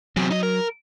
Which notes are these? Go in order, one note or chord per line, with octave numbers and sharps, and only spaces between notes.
E2 C3 F#3
D#4 D#5
A#4